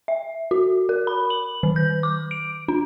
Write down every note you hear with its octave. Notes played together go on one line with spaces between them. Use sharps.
E5
F#4
A#4
B5
F#7
D#3
G6
D6
D7
D4